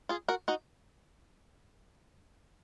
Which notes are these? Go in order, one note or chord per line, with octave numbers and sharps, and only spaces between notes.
F4 G#4
F#4 A#4
D#4 F#4